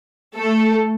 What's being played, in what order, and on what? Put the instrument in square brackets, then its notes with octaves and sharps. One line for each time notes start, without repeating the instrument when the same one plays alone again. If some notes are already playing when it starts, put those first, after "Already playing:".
[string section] A3 A4